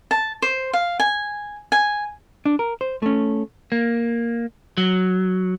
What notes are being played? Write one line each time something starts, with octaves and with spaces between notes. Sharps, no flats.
A5
C5
F5
G#5
G#5
D4
A#4
C5
A3 C#4
A#3
F#3